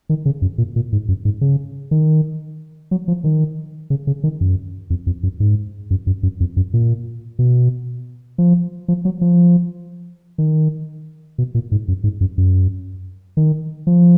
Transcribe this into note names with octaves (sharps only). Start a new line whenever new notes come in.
D#3
C#3
F#2
A#2
A#2
G#2
F#2
G#2
C#3
D#3
F#3
F3
D#3
C#3
C#3
D#3
F#2
F2
F2
F#2
G#2
F#2
F#2
F#2
F2
F#2
A#2
B2
F3
F3
F#3
F3
D#3
B2
A#2
G#2
F#2
G#2
F#2
F#2
D#3
F3